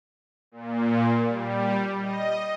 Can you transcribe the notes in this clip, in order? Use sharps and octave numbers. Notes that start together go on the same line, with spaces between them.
A#2
G3
D#5